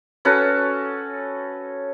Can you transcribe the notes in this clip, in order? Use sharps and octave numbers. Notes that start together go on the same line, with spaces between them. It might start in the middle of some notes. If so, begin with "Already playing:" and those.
C#4 F#4 A4 B4